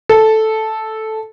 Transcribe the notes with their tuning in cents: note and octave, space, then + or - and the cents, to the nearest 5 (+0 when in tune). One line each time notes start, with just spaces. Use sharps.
A4 -5